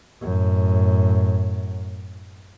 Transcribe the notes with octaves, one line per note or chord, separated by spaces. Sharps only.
F#2 A2